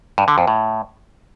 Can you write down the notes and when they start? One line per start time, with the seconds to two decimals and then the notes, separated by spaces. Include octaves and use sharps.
0.18 G2
0.28 D3
0.38 F2
0.48 A2